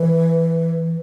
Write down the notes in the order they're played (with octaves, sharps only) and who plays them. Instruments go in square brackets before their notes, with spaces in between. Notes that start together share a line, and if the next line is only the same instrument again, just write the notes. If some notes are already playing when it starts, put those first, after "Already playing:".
Already playing: [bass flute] E3